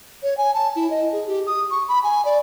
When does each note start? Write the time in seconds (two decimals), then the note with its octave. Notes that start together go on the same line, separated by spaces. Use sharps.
0.23 C#5
0.37 G#5
0.54 A5
0.76 E4
0.91 D#5
1.12 G#4
1.27 G4
1.47 D#6
1.71 C#6
1.88 B5
2.04 G#5
2.25 D5